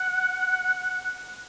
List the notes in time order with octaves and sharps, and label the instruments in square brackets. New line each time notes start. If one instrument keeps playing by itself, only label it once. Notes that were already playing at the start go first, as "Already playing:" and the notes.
Already playing: [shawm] F#5